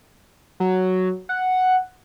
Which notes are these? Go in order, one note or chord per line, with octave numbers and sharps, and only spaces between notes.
F#3
F#5